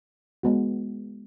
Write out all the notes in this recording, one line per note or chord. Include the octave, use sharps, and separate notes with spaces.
G#3 B3 F#4